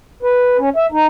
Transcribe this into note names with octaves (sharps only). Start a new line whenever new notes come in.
B4
C#4
E5
D#4